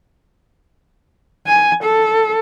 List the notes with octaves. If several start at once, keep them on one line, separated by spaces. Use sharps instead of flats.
G#5
A4